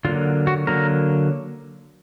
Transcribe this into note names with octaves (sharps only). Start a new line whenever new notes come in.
D3 F#3 A#3 F4
F#4
D3 F#3 A#3 A#4